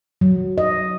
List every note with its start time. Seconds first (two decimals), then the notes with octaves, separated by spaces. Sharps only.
0.21 F#3
0.58 D#5